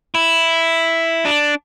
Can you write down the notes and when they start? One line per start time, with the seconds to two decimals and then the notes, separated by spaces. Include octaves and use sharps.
0.15 E4
1.25 D4